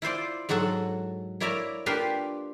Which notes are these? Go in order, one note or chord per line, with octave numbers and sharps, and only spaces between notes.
E4 F4 C5 D5
G#2 F#3 F#4 A4 F#5
A#3 E4 C#5 D5 E5 A#5
A#3 D4 F4 G4 B4 F5